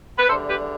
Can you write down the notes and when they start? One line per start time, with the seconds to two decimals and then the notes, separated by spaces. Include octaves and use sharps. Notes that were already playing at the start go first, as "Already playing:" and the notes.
0.18 B4
0.29 E2 D3 G3 A4 C5
0.49 G4 B4